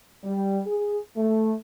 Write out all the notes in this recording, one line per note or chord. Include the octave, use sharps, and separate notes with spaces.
G3
G#4
A3